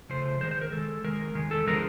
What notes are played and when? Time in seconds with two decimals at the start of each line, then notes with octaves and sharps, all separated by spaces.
0.09 C#3 F3 A3 C5
0.41 D#3 G#3 C5
0.51 C5
0.61 A#4
0.72 D#3 G#3 A4
1.04 D#3 G#3 A#4
1.35 D#3 G#3
1.51 A4
1.66 D3 F3 G#3 A#4